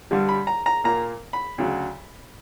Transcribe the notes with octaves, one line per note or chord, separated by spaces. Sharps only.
G2 D3 G3
B5
A#5
A#5
A#2 A#3 A#5
B5
D2 C#3 F#3